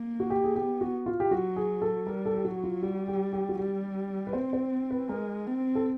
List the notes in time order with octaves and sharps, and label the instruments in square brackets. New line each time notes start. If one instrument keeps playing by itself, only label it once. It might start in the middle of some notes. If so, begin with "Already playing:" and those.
Already playing: [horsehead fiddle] A#3
[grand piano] F#4
G4
G#4
[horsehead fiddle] B3 [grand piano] G4
[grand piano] F#4
F4
G4
[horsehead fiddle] F#3 [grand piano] F#4
[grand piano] G#4
A4
[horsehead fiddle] G3 [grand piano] A#4
[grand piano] A4
G4
[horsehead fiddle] F#3 [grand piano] F#4
[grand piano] F4
[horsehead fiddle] G3 [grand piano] F#4
[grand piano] G4
G4
F#4
[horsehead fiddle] G3 [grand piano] G4
[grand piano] B4
[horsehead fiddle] C4 [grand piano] C5
[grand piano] C5
B4
[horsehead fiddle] G#3 [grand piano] A#4
[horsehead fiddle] C4
[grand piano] A4